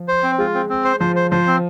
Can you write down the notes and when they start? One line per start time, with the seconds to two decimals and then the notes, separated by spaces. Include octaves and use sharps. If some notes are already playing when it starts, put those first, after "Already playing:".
Already playing: F3
0.08 C5
0.23 C4
0.38 G#3 F4
0.54 C4
0.69 C4
0.85 C5
1.00 F3 C5
1.16 C5
1.31 F3 C5
1.47 C4